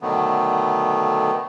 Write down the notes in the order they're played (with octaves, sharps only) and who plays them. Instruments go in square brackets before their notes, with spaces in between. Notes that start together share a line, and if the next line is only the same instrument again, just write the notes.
[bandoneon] B2 D3 D#3 F#3 A3 B3